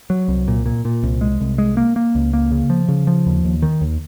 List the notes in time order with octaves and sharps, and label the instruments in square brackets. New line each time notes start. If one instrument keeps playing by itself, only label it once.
[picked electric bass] F#3
C2
A#2
A#2
A#2
C2
G#3
C2
G#3
A#3
A#3
C#2
A#3
C#3
F3
C#3
F3
D#2
D#2
D#3
D#2